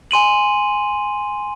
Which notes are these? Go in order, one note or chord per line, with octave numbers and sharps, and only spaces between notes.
G#5 C6 D#7 F#7